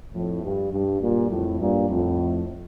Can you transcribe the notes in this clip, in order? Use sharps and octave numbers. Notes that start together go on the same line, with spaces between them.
F2 A2
G2
G2
G2 A#2
F2 A2
G2 A#2
F2 A2